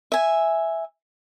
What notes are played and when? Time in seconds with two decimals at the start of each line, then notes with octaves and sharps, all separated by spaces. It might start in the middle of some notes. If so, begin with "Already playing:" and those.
0.12 E5 G#5